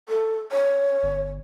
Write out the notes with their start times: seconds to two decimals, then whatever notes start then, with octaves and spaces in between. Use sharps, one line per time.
0.09 A4
0.52 C#5
1.03 G1